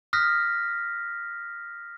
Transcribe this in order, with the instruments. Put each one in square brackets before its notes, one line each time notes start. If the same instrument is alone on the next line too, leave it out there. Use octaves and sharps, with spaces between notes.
[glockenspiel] D#6 F6 F#6 A#6 B6